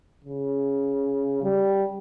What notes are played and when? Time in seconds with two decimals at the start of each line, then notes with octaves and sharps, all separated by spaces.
0.25 C#3
1.43 G3